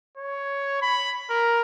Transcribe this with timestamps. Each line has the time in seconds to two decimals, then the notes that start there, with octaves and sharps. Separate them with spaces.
0.18 C#5
0.82 B5
1.30 A#4